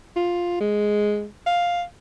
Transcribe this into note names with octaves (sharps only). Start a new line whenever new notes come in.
F4
G#3
F5